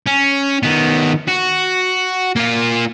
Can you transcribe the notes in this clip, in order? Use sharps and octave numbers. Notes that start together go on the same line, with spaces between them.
C#4
D#3 B3
F#4
A#3 F4